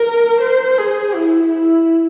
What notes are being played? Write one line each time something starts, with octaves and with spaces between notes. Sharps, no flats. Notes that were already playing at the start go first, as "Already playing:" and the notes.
Already playing: A#4
C5
G#4
E4
E4